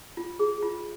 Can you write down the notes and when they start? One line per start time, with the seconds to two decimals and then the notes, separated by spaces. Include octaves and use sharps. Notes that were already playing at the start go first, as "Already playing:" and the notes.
0.17 F4
0.39 G#4
0.62 F4